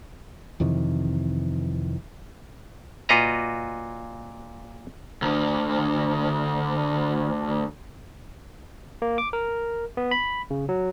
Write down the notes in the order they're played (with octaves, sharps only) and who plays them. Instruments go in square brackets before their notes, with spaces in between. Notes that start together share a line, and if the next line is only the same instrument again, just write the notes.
[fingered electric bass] F2 C3 D#3 E3
[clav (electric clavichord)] A#2 F4 F#4 B4 D#5 A#5
[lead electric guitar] D2 D3
[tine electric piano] A#3
D6
A#4
B3
B5
C#3
F#3